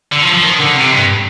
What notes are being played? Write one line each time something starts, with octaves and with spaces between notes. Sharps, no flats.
D3
F3
F3
D#3
D3
C3
G2